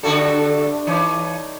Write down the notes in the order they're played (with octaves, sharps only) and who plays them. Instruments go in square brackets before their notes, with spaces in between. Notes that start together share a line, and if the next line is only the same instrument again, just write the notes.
[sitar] D3 F#4 A4 [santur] G3 A3 [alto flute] D4
[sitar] E3 [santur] D#4 C#5 D6